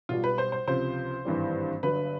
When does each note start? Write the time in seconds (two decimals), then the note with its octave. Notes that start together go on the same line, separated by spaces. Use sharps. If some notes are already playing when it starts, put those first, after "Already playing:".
0.09 B1 B2 G3 F4
0.24 B4
0.38 C5
0.52 C5
0.67 C#2 C3 F3 C5
1.25 G#1 G2 E3 G3
1.83 G1 G2 D3 F#3 B4